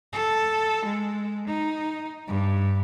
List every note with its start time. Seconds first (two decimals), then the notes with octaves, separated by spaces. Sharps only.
0.13 A4
0.85 G#3
1.47 D#4
2.27 G2